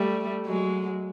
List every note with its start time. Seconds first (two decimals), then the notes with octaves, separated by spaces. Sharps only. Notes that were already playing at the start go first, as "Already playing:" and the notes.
Already playing: G3 A3
0.46 F#3 G#3